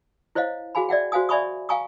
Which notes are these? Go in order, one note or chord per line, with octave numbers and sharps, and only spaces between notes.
E4 C5 C#5 D#5 F5
F#4 G#4 F5 G#5 B5
D5 E5 F#5 G5
F#4 C5 F5 G#5 D#6
D5 E5 G#5 B5 C#6 D#6
F5 G5 G#5 A#5 C#6 D#6